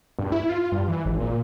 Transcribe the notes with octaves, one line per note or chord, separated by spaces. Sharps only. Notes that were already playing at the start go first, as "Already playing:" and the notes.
G2
E4
F4
G2
E3
G#1
A#2